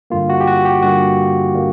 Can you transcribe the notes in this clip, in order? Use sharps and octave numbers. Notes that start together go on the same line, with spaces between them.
G2 D3 G3 A#3 F4
F#4
G4
F#4
G4
G2 D3 G3 A#3 F#4
D3 G3 A#3